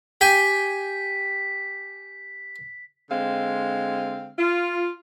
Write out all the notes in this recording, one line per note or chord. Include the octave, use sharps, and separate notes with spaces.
G4 G5 G#5 B6
D3 G#3 C4 F5
F4